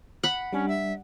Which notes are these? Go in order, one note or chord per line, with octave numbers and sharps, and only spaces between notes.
F#5 B5
G3 C#4 D4
E5